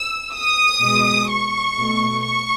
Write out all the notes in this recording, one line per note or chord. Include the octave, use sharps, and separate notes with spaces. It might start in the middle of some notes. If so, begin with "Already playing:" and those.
Already playing: E6
D#6
B2 G#3
C#6
B2 A3
C#6